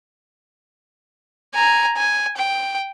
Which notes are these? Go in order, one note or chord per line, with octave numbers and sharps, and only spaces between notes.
G#5 A#5
G#5
G5